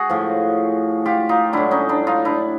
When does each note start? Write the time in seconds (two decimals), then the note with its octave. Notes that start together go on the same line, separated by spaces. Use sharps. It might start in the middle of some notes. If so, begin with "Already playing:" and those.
Already playing: F#4 G#4
0.10 A2 F3
1.06 F4 G4
1.29 D#4 F4
1.53 A2 F#3 D4 E4
1.71 C#4 D#4
1.89 D4 E4
2.07 D#4 F4
2.25 D4 E4